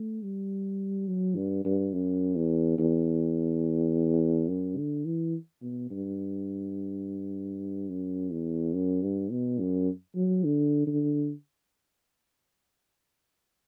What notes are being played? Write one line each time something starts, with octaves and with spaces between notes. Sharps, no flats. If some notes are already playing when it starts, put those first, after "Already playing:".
Already playing: A3
G3
F#3
G2
G2
F#2
E2
E2
F#2
D3
E3
B2
G2
F#2
E2
F#2
G2
B2
F#2
F#3
D3
D3